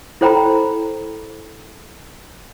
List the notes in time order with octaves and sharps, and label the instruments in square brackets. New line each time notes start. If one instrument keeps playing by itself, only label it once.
[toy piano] E4 A4 C5 G5 A#5 B5